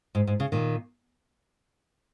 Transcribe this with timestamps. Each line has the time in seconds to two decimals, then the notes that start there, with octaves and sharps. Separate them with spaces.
0.15 G#2
0.27 G#2
0.40 C#3
0.52 A#2 D#3